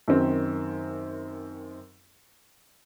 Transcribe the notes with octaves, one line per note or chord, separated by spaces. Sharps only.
F#2 D#3 C4